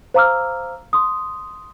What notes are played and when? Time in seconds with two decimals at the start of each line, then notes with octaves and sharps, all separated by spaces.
0.14 C5 F5 A#5 D6 E6 F6
0.93 C6 D#6